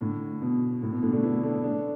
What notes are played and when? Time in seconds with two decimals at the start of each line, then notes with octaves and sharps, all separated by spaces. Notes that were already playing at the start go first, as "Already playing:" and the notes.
0.01 A2 D3
0.42 B2
0.83 A2
0.93 B2
1.03 A2 D3
1.13 A3 D4
1.23 B3 E4
1.43 A3 D4
1.64 A3 D4